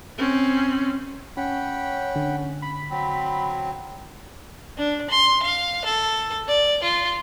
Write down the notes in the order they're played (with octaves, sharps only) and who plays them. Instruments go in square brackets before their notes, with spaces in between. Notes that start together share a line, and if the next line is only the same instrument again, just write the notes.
[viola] C4 C#4
[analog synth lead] C#4 [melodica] F#5 G5 B5
[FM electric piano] D3
[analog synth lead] B5
[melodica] F#3 C4
[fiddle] D4
C6
F5
A4
D5
F4